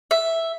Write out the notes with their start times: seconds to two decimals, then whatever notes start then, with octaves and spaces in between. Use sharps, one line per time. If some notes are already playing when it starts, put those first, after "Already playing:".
0.11 E5